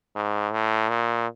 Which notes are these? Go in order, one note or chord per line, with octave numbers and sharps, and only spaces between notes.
G#2
A2
A#2